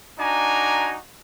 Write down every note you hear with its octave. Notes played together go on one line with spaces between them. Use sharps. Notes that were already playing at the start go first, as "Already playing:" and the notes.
D4 D#4 F#4 G#5 A#5 D6